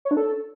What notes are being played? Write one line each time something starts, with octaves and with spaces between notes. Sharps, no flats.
C#5
D4
A4